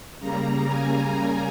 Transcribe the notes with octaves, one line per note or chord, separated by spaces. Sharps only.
C#3 G3 A#3 A#5
G#5
A#5